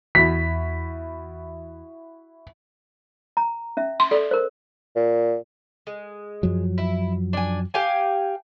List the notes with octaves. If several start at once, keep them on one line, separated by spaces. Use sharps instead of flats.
E2 E4 F#4 B6
A#5
C#4 E5
C6
A4 D5
A#4 C5
A#2
G#3
F#2 F3 F#3
E4
D4 G#5
G4 F5 G#5